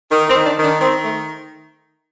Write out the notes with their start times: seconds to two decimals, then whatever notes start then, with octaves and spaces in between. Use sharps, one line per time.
0.11 D#3
0.28 C4
0.34 D#3
0.46 D4
0.58 D#3
0.63 D4
0.81 D#3 C4
1.04 A3